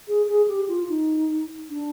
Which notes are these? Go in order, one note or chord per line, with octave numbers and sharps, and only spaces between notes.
G#4
G#4
G4
F4
D#4
D4